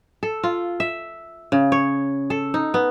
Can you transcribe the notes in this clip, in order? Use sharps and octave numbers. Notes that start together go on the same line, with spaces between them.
A4
F4
E5
C#3
C#5
A4
D#4
B3